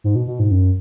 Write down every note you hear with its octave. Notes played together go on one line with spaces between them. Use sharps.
G#2
B2
B2
G#2
F#2